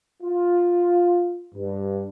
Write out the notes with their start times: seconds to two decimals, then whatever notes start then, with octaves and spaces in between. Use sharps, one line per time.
0.23 F4
1.54 G2